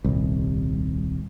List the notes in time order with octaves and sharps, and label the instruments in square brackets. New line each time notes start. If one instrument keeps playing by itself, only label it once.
[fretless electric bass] D#1 C2